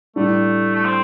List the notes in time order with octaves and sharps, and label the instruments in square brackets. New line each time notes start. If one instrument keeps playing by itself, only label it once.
[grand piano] A2 G3 D4 [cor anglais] A3
[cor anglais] A3
C4